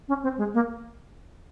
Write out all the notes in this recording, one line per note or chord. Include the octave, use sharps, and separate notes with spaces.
C#4
C4
G#3
A#3